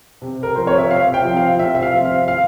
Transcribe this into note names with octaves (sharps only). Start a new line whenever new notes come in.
C3
A#4
F3 C4 C5
C#5
E5
C3 F5
G5
F3 C4
F5
C3 E5
E5
F5
F3 C4
F5
F5